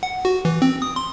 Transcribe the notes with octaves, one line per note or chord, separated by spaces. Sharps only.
F#5
F#4
E3
C4
D#6
C6